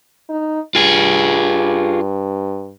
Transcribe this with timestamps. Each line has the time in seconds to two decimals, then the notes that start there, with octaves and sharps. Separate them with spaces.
0.29 D#4
0.75 G2 F4 G#4